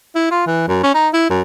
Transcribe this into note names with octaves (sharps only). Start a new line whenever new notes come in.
E4
F4
E3
F#2
C#4
D#4
E4
F#2